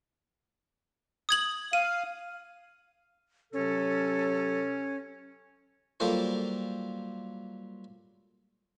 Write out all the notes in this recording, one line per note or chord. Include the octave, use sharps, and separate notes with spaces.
D#6 G#6 F#7
F5 D#7
C3 F#3 C#4 A4
F#3 G3 A#3 F4 A4 C5